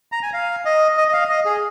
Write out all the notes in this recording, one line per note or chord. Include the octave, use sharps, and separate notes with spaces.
A#5
G#5
F5
D#5
D#5
D#5
F5
D#5
G#4